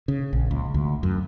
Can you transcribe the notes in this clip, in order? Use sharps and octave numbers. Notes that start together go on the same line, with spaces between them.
C#3
A#1
C#2
D2
F#2